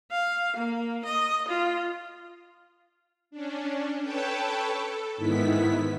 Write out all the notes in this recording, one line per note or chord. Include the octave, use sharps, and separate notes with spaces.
F5
A#3
D#5
F4
C#4 D4
A4 B4 C#5 G5 A5
A4
G#2 D#3 B3 E4 B6